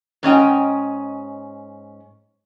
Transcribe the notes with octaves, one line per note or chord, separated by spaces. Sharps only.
G#2 C#4 D#5 G5